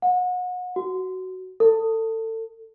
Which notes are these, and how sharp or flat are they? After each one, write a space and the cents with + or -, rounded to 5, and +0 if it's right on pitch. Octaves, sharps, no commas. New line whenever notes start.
F#5 -35
F#4 +10
A4 +30